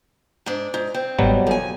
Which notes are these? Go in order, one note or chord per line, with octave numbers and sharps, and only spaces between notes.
G#2 D4
G#2
C4
G1 G#2 B2 F#3 G3
D#2 A4 G#5